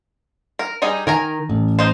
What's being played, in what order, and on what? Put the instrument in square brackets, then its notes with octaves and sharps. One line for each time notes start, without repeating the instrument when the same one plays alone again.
[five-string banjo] A#4
G3 D#4 G#4
[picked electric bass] D#3 [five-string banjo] A#4 G#5 A#5
[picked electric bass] A1
[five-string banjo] D#4 C5